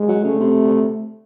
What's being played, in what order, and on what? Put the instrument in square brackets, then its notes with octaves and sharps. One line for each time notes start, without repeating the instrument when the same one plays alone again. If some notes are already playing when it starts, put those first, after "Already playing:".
Already playing: [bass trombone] G#3
[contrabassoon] F#3
[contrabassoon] C#3 [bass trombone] A3
[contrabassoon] C3